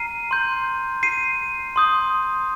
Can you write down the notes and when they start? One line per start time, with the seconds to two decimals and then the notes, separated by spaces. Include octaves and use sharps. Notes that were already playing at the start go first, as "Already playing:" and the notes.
Already playing: A#5 F6 C7 D#7
0.31 C6 G6
1.03 C7 D#7
1.76 C6 D#6 G6